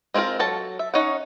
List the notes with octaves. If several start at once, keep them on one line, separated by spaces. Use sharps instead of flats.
G#3 C4 D4 F4 A#4
F#3 A4 A5
E5
C#4 D#4 C#5 F#5